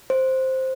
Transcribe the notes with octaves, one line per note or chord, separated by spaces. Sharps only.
C5